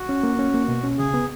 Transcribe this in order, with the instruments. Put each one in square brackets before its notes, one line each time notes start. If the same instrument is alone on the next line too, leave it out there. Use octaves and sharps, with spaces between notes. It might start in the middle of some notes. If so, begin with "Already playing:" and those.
Already playing: [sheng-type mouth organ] F#4
[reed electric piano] C#4
A#3
C#4
A#3
B2
C#4
[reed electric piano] C#3 [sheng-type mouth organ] G#4
[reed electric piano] B3